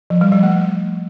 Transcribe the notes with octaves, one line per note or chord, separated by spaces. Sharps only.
F3
G3
F3
A3